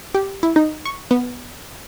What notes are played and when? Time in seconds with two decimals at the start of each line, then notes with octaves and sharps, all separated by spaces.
0.15 G4
0.43 E4
0.56 D#4
0.85 C#6
1.11 B3